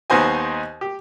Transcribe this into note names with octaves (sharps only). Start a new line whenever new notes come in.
D#2 B3 D#4 C5 D#5 G#5
G4